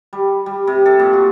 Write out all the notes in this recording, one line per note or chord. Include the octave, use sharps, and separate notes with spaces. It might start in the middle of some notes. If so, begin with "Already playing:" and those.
G3
G3
C3
A4
A#2
F#4